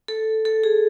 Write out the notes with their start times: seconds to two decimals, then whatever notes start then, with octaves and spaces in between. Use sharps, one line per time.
0.08 A4
0.45 A4
0.64 G#4